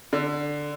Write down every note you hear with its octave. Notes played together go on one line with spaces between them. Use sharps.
D3